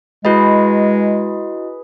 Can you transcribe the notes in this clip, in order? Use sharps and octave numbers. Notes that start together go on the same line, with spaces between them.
G#3 E4 F#4 G#4 B4 D#5